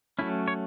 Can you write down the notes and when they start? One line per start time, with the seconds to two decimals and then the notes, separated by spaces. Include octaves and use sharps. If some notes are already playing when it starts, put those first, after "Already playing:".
0.19 F#3 A3 C#4 E4
0.48 C#5